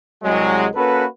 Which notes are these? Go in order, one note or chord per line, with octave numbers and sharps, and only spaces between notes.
C2 F#3 G#3
A#3 C#4 F#4 A4 B4